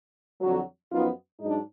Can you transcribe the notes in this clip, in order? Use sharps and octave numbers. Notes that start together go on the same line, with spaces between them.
F2 D3 F#3
F#2 F3 B3 D#4 F4
G#2 F#3 D4 D#4